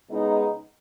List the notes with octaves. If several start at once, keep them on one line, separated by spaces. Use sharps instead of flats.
C#3 G#3 B3 D#4